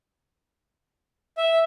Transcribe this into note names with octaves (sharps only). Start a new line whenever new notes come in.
E5